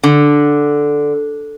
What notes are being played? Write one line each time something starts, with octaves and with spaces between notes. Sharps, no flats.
D3